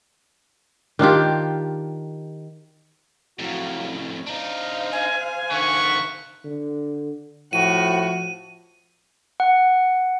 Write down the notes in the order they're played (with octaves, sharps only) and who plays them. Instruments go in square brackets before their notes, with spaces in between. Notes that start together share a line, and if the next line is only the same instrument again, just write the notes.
[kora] D#3 D4 F4 G4
[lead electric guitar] F2 A2 [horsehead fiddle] F#3 F5
[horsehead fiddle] C#4
[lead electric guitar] D4 D#4 [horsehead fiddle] C5 F5
[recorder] G#5
[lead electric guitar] D3 D#3 [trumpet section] E5 F#5 C#6
[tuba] D3
[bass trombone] A2 [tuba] F3 [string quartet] F#4 [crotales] D#7
[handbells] F#5